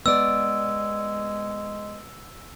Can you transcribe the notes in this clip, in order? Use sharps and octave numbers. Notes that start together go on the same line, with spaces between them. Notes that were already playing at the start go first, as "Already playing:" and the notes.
G#3 B3 D5 E6